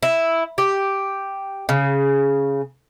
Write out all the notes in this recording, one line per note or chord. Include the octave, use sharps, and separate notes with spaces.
E4
G4
C#3